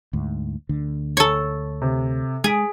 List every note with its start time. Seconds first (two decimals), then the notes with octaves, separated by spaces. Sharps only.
0.13 D2 G#2
0.69 D2 D3
1.17 A4 C#5
1.82 C3
2.44 G#3 G#4 G#6 B6 D7